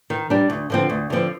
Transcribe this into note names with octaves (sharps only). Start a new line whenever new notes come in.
D#3
G3 D4
D2
D3 F3 C4
D2
D3 F3 C4